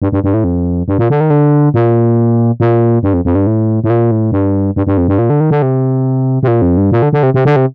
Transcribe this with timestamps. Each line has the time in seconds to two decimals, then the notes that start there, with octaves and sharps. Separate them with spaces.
0.02 G2
0.12 G2
0.24 G2
0.34 A2
0.44 F2
0.88 G2
0.99 A#2
1.10 D3
1.21 D#3
1.30 D3
1.74 A#2
2.60 A#2
3.03 G2
3.14 F2
3.25 F2
3.35 G2
3.47 A2
3.84 A2
3.90 A#2
4.11 A2
4.32 G2
4.76 G2
4.87 G2
4.97 F2
5.08 G2
5.19 A#2
5.30 D3
5.40 D#3
5.51 D3
5.62 C3
6.43 C3
6.48 A#2
6.62 F2
6.77 G2
6.92 A#2
7.02 D3
7.13 D3
7.23 C3
7.34 C3
7.45 D3
7.56 C3